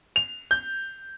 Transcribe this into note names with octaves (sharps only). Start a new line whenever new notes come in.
F7
G6